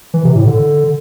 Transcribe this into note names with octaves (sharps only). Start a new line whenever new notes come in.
E3
C3
A2
D3